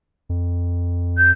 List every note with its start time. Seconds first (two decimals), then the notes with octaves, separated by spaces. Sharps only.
0.29 F2
1.18 G6